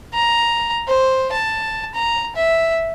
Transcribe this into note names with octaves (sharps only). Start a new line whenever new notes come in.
A#5
C5
A5
A#5
E5